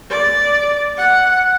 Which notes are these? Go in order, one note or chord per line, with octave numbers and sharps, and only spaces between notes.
D5
F#5